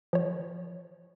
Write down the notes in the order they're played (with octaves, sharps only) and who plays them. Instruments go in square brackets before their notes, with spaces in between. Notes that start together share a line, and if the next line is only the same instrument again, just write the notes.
[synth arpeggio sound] F3 C#5